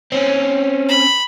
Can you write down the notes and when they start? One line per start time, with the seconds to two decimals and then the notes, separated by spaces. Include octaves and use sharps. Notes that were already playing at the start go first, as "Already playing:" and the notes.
0.12 C4 C#4 C#5
0.89 B5